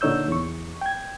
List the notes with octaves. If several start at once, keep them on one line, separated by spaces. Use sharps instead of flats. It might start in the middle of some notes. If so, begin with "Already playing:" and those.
A#2 D3 D#4 C#5 E6 G6
E2 C#6
G5 G#6